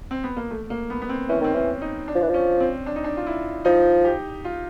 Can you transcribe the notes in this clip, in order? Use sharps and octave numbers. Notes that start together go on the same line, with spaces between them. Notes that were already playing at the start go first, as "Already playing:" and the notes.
C4
B3
A#3
A3
A#3
B3
B3
C4
E3 C#4
D#3 C4
E3 C#4
D#4
D4
F3
E3
F3
C#4
C4
D4
D#4
D4
F4
E4
F3 D#4
G4
F4